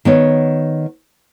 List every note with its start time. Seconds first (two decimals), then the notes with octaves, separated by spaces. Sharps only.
0.05 D#3 B3 C#5